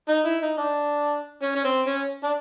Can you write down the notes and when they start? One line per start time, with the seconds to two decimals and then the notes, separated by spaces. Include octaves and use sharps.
0.09 D#4
0.25 E4
0.43 D#4
0.58 D4
1.42 C#4
1.55 C#4
1.64 C4
1.87 C#4
2.24 D4